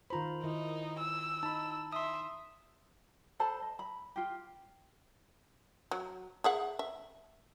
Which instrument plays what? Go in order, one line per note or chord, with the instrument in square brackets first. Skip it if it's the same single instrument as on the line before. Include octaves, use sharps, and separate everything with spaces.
[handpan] D#3 F4 C5 [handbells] A#5 B5
[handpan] D#3 E4 [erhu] D#4
[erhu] E6
[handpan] D#4 [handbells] A5 B5
[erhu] E5 [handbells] C6 D#6
[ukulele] A4 C5 A5 B5
D#5
B5
F4 G4
[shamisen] F#3
G#4 E5 F#5
E5